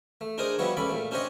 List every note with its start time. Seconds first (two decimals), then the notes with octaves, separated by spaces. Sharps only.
0.21 A3
0.38 D4 D#4 G#4 A#4 C5 D#6
0.59 F3 G3 B3 E4 F#4 C#5
0.77 C#2 C#4 A4 D5 B5
0.90 A#2 A3
1.11 C#4 D4 G4 C5 C#5 D#5